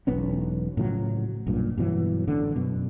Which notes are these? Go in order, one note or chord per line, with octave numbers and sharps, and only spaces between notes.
E1 B1 B3 C#4
A2 C#3 F3 F#3
B1 G2 A#2
G2 B2 E3 F#3
A1 D3
F#2 B2